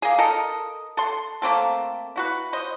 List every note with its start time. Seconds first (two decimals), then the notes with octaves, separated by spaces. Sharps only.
0.02 A#3 G#4
0.18 A4 A#4 D#5
0.97 A4 C6
1.42 A3 A#3 C4 A4
2.16 E4 F#4 B4
2.53 C5 D#5